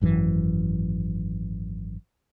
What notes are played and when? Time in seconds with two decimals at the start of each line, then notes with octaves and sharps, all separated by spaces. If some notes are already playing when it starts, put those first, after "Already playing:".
0.01 G#1 F#2 D3 E3